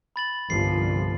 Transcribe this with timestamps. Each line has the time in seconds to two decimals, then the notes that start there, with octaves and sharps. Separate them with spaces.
0.16 B5 A6 F#7
0.50 G1 C2 F3 C7